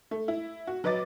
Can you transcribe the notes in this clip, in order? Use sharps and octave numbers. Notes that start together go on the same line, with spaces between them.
A3
E4
F#4
F#3 B4 D#5 D6 A6